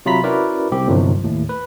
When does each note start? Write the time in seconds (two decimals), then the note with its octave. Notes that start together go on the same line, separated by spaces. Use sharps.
0.06 C3 F#3 F4 A#5 B5 B6
0.24 C#4 E4 F#4 A#4 B4 D5
0.72 C2 C4 G4
0.87 G1 C2 G2 B2 F3 F#3
1.23 D#2 A2
1.49 B4